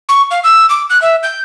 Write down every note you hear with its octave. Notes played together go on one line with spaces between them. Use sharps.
C#6
F5
E6
D6
F#6
E5
G6